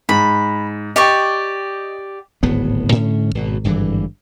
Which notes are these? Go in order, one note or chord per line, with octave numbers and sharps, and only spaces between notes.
G#2 B5
G4 D5 D#5 G5 C#6
D1 G#1 A2 B3
G#2 D3 C#4
G#1 B2
G#1 G2 D3 E3